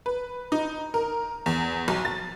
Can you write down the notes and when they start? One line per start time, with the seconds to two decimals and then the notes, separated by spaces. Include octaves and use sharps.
0.06 B4
0.52 D#4
0.94 A#4
1.46 E2
1.88 B1
2.05 A6